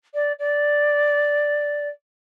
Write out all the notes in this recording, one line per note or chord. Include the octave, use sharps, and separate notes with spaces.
D5
D5